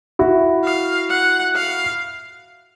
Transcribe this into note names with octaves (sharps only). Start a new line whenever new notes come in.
E4 F#4
F5
F#5
F5